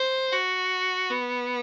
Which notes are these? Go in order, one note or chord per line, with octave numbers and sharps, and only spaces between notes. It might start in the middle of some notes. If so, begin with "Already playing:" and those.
Already playing: C5
F#4
B3